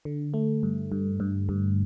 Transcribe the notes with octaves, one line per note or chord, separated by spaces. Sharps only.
D3
A3
G2
G2
G2
G2